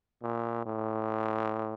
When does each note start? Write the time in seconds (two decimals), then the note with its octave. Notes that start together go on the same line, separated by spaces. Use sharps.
0.22 A#2
0.66 A2